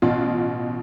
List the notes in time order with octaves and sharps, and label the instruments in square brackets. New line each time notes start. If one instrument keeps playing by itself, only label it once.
[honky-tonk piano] A1 B2 F4